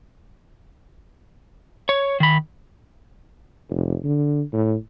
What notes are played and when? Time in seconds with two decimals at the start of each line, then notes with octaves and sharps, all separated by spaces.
1.89 C#5
2.20 D#3 B5
3.70 F1
4.04 D3
4.53 A2